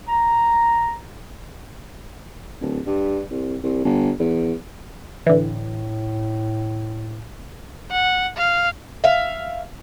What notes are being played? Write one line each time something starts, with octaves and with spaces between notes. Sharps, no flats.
A#5
D1
G2
C2
C2
G1
E2
A2 D3 E3
F#5
F5
E5 F5